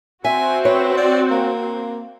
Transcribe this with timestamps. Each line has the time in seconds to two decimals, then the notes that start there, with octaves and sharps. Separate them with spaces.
0.25 C4 F#4 E5 G#5
0.65 B4 C#5
0.97 D5
1.31 A#3